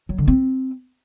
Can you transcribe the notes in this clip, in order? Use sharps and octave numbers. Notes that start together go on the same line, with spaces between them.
F#3
D3
C4